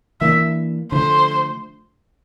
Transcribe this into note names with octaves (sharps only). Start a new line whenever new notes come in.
E3 A#3 D4 E5
D3 F3 A3 C5